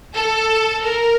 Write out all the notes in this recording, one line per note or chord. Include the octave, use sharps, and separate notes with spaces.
A4
A#4